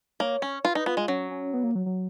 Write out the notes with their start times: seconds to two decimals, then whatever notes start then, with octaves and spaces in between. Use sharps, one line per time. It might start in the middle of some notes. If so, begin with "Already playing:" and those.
0.20 A#3 C#5
0.42 C#4
0.65 F4 B4
0.75 D#4
0.86 B3 F4
0.97 G#3
1.08 F#3 C#4
1.31 C#4
1.53 B3
1.64 A#3
1.75 F#3
1.86 F#3